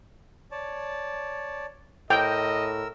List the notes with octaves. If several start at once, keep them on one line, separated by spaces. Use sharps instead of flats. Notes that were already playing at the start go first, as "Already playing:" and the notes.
C#5 D5 A5
A2 A#4 D#5 G5 E6